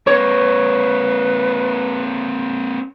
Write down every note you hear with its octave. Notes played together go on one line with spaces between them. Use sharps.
A#3 C4 B4 C#5